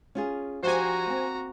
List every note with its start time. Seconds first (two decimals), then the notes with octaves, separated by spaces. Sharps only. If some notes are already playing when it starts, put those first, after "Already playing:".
0.15 C#4 F4 G#4
0.63 F3 D4 F#4 G4 C5 G#5 A#5
1.06 A#3 C4